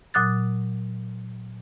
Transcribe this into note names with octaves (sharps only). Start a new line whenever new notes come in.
A#2 F#3 D6 D#6 F#6 A6